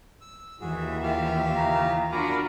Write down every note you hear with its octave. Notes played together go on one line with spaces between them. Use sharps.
E6
D#2 E3 F#4 G#4 E5
F4 G4 F5
C#3 A#5
D4 F4 F#4 A#4 G#5 A#5 B5 D6